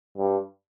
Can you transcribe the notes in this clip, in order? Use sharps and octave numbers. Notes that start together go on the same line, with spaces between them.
G2